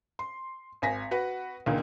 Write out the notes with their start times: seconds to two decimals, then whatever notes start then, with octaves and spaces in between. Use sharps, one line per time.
0.19 C6
0.82 G#1 G#5 A#6 B6
1.11 F#4 B4 F#5
1.66 C#2 A#2 D3 D#3